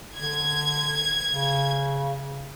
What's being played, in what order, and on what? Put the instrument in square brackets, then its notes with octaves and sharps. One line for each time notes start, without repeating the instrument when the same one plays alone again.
[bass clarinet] D3 [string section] G#6
[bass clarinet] C#3